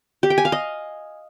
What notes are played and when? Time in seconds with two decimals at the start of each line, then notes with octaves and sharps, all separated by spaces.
0.23 G4
0.30 G5
0.38 G#5
0.45 F5
0.52 D#5